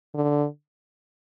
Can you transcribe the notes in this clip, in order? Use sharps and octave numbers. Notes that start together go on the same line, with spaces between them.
D3